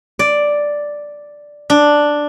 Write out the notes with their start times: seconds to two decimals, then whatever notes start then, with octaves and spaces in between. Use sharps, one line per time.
0.19 D5
1.70 D4